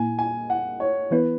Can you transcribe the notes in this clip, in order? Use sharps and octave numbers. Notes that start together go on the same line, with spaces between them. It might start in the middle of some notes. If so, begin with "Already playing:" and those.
Already playing: A#2 A#3 E4 G#5
G#5
F#5
C#5
E3 B3 E4 B4